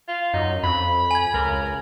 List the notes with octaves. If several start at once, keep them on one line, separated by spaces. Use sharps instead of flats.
F4
F#2 D#4
F2 B5
G#5 G#6
C#2 A#4